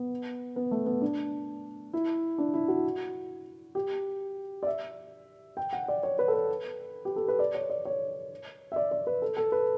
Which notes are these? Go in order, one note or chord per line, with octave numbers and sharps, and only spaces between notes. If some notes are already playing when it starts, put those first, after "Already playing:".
Already playing: B3
B3
A3
B3
D4
E4
D4
E4
F#4
G4
D5
E5
G5
F#5
D5
C#5
B4
A4
B4
G4
A4
B4
D5
C#5
D5
C#5
E5
D5
D5
B4
A4
A4
B4